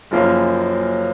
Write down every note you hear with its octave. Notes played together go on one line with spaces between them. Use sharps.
F#1 F#2 F3 A#3 C#4